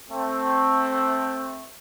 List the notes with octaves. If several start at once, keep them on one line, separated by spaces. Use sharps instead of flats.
A3 C4